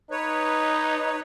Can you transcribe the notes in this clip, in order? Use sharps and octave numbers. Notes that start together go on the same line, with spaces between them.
D#4 B4 C#5